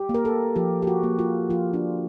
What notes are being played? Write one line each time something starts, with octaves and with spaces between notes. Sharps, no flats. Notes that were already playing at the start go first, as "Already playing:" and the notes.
Already playing: G4
A#3
A#4
A4
F3 G4
G4
F#4
A#3
F4
F3 F4
D4